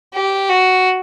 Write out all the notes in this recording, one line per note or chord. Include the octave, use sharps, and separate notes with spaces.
G4
F#4